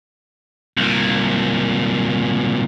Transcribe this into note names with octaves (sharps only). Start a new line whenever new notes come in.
C2 A#2